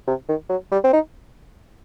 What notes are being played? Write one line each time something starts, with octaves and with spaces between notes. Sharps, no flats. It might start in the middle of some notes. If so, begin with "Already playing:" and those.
C3
D#3
F#3
G3
C4
D#4